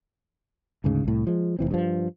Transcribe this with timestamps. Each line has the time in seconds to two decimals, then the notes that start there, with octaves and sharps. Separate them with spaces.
0.84 D2 G#2 C#3
1.04 C2 A2
1.27 F3 G#3
1.59 F1 E3 C4
1.71 G2 F3